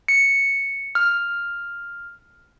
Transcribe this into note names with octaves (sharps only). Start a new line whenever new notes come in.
C#7
F6